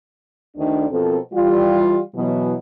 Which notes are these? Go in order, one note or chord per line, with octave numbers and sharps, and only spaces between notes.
D2 D3 D#3 D4
B2 F3 C4 A4 A#4
E3 G3 F4
B2 E3 F#3